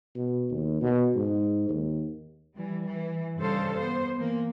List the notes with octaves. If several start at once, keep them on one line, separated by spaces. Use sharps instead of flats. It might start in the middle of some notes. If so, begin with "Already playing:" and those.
B2
D#2
B2
G#2
D#2
E3 G3
E3
G2 C#3 A4 C5 F5
B3 C5
E3 A#3